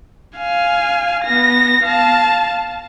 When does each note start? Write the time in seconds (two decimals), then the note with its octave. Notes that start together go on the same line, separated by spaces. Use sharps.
0.38 F5 G#5
1.25 B3 A#6
1.84 F5 A5